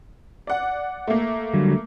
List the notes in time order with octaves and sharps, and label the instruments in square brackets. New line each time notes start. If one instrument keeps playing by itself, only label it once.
[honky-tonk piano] D5 F#5
A3 A#3
[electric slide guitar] D3 F#3 G3